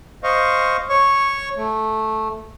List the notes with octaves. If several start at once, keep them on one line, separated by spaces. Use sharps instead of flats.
C5 D#5 F5 C#6
C#5 C#6
A3